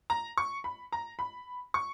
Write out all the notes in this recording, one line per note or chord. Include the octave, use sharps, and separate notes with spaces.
A#5
C#6
B5
A#5
B5
C#6